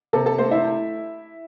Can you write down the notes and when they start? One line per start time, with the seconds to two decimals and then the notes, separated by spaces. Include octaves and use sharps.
0.13 C3 A4 A5
0.26 A4 A5
0.38 A3 C5
0.51 E4 E5